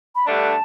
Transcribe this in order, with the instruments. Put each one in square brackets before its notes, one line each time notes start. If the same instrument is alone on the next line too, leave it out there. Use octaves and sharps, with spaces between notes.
[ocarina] B5
[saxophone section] G2 D3 A3 D4 [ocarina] A5